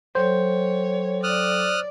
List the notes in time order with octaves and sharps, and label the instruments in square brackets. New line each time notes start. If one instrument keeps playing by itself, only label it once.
[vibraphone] F#3 A4 G5 [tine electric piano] C5 [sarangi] C#5
[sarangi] D5 [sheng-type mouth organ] D#6 F6 F#6